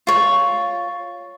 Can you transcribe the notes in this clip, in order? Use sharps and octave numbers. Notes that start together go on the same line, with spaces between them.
F4 C#5